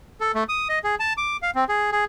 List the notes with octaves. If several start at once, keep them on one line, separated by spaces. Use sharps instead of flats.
A4
A3
D#6
D#5
G#4
A5
D6
F5
C4
G#4
G#4